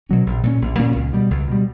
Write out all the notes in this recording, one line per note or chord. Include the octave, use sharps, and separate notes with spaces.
B2 F#3 C#4
A#1
A#2 A#3 C#4
A#1
A#2 A#3 C#4
C#2
B2 G3
C#2
B2 G3